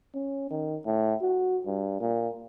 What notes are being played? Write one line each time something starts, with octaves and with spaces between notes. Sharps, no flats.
C#4
D#3
A2
F#4
G2
A#2